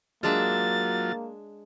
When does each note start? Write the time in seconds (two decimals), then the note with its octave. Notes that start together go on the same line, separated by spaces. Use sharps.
0.23 F#3 G#3 A#3 D4 F4 E5 A6